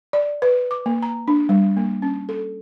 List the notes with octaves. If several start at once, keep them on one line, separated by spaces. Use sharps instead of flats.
D5
B4
D6
A#3
A#5
D4
G3
A#3
C#4
A4